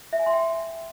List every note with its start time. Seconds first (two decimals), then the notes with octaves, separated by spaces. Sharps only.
0.13 E5
0.19 G#5
0.26 C6
0.33 G5